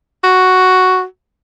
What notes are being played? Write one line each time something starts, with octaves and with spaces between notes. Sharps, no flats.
F#4